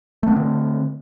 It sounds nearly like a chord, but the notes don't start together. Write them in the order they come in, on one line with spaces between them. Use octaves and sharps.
A3 B3 C4 D3